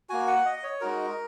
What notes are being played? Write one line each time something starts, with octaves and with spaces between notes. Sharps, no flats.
A#3 F#4 G#5
F#5
D#5
C#5
G#3 D#4 F#4 A#4